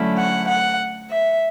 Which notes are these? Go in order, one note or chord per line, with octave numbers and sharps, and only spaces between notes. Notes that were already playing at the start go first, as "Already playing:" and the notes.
Already playing: D3 F#3 A3 C#4 E4
F#5
F#5
E5